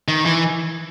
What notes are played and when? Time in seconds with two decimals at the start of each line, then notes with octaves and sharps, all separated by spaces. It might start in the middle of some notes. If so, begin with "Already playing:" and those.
0.08 D#3
0.25 E3